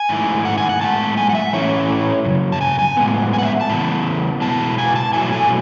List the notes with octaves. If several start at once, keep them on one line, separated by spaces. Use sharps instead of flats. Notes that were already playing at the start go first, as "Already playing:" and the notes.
Already playing: G#5
G#2 D#3 A3 E4
F#5
G#5
F#5
A2 E3 G#3 A5
G#5
F#5
E5
A2 E3 A3 C#4 E4 C#5
F#2 C#3
A5
G#5
G#5
A2 G#3 B3
G#5
F#5
E5
A5
C#3 E3 B3 E4
B2 G#3 B3 E4 A5
G#5
A5
B2 F#3 A3 E4 G#5
G#5